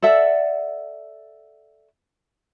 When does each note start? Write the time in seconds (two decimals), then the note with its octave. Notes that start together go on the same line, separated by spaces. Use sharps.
0.03 A4 D5 E5 F#5